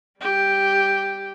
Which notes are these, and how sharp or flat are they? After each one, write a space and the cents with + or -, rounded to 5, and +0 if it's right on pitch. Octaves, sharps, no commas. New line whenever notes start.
G3 +5 G4 +0